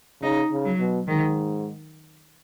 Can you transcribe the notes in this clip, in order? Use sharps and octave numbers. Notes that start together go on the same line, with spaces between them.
C#3 D#4
C#3
F#3
B2
G#2 D#3